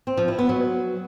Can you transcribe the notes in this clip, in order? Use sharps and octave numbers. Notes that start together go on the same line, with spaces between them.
C4
F3
E4
B3
F#3